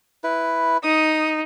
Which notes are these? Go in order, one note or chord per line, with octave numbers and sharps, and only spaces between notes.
E4 B4
D#4 D#6